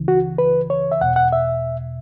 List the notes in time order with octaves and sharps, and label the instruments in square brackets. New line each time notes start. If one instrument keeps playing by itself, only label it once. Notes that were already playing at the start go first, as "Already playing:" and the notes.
Already playing: [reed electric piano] C#2 C#3 E3
F#4
B4
C#5
E5
E2 B2 F#5
F#5
E5